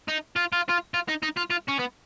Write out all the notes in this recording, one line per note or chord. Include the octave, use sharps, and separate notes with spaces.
D#4
F4
F4
F4
F4
D#4
D#4
F4
F4
C#4
B3